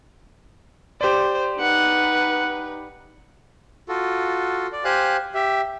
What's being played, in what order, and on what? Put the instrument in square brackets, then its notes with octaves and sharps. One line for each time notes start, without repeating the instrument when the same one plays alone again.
[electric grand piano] G4 D5 [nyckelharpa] C5
[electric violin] D#4 B4 [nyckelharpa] F#5
[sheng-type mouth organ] F4 F#4 A4
D5
G4 C5 F5 G#5 F#6
G4 E5